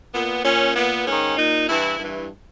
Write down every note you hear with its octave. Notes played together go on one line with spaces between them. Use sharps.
A#2 B3
A#2 C#4
A#2 B3
G#2 D#3 C#4
A#2 D#4
G2 E3 E4
G2
E3